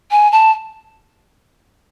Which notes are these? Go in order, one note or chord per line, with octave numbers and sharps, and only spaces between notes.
G#5
A5